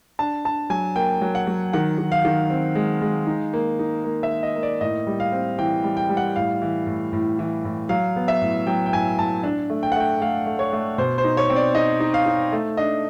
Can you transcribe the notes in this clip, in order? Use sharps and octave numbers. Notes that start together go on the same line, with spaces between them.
D4 A5
D4 A5
F#3 G#5
A#3 G5
F#3
F#5
F#3
D#3 F#5
D#3
F5
D#3
C4
G#3
G#3
D#4
A#3
D#4
A#3
E5
A#3
D#5
A#3
D5
A2 D#5
G3
F5
C4
E3 G5
G3
G5
G3
F#5
A2 F5
E3
A2
A2
E3
A2
F#3 F5
B3
E5
A2
F#3 G5
G5
A2 G#5
A2 A5
D4
A3
G5
F#5
A3 G5
A3 F5
A3
C#5
A3
B2 C5
C5
D#4
C#5
C4
D5
D#4 D#5
D#4
F5
D#4
A3
D4 D#5